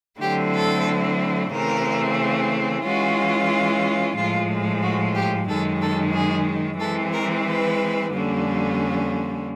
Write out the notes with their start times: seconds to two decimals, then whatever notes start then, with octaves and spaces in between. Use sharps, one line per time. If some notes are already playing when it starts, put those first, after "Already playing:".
0.20 D3 F#3 A3 C4 E4 G4
0.53 A4
1.52 C#3 E3 A3 C4 A#4
2.84 E3 G#3 C#4 F4 F#4
4.16 A2 F3 G#3 F4
4.82 F#4
5.14 G4
5.48 F#2 D#3 G#3 A4
5.81 A4
6.13 G#4
6.80 E3 G#3 C4 A4
7.12 A#4
7.46 B4
8.12 F2 D3 G3 A#3 C#4